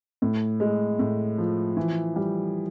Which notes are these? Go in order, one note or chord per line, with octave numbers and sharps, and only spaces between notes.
A2
G#3
A2
F3
E3
G3